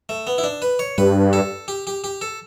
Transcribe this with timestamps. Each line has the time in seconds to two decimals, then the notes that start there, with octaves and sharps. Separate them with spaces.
0.09 A3
0.27 B3
0.38 E4
0.44 D4
0.62 B4
0.79 C#5
0.98 G2 B4
1.33 A4
1.68 G4
1.87 G4
2.04 G4
2.21 A4